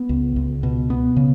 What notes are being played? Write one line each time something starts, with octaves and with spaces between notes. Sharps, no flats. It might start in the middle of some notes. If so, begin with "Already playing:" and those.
Already playing: B3
C#2
C#2
B2
B3
C#3